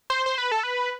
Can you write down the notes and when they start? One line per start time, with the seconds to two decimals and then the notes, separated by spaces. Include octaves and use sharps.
0.10 C5
0.26 C5
0.38 B4
0.52 A4
0.63 B4